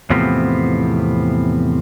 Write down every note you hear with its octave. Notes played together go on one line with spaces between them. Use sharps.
E2 A2 C3 F3 B3 C4